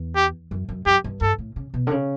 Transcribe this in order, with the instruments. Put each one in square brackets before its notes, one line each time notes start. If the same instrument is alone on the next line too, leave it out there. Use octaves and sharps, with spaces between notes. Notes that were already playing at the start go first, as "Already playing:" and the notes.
Already playing: [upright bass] E2
[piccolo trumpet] G4
[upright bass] F#2
F#2
[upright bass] F#2 [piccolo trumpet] G4
[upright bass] G2
[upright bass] G2 [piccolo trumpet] A4
[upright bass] A2
C#3
B2
D3
C#3